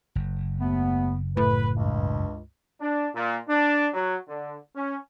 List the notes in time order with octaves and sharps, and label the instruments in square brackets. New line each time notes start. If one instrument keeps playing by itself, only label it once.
[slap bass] F#1
[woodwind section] D#2 A3 B3
[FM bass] A2 [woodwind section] B4
[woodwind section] C#2 G2
[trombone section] D4
A#2
D4
F#3
D3
C#4